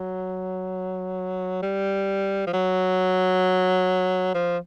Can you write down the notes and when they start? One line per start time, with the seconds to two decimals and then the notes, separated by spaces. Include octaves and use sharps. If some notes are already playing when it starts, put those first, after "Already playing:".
Already playing: F#3
1.62 G3
2.47 F3
2.53 F#3
4.34 F3